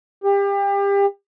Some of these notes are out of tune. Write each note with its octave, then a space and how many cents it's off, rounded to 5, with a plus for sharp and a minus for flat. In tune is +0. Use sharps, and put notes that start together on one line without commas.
G4 +30